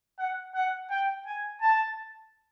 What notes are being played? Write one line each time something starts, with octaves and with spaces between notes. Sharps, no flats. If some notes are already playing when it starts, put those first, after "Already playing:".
F#5
F#5
G5
G#5
A5